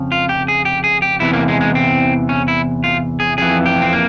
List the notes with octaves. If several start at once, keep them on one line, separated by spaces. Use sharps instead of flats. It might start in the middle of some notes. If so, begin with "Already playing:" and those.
Already playing: F2 C#3 F3
F4
G4
G#4
G4
G#4
G4
E2 C3 E3 E4
A#3
G#3
G#3
C4
C#4
E4
F4
G#4
F2 E3 G#4
G4
C4
A#3